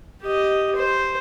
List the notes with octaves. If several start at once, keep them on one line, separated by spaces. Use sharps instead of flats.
G4 D#5
C5